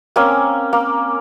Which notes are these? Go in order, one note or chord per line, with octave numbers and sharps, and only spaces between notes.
A#3 C4 C#4 G#5
A#3